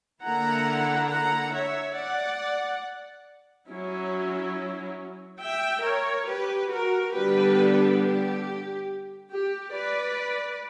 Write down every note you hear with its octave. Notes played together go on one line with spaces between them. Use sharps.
D3 A#3 E4 F#5 A#5
F#5 A#5
C#5 E5
D5 F#5
F#3 C#4 E4
E5 G5
A#4 C#5
G4 B4
F#4 A#4
D3 G3 B3 D4 G4 B4
G4
G4
B4 D5